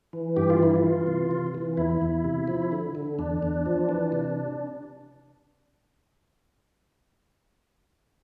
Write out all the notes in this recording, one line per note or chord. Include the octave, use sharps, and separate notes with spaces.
E3
G2 G4
F4
E3 E4
F4
E3
C3
C3
E3
E2 E4
E2
C3
F3
D3
D3
E2 D4
E2
F3
E3
C3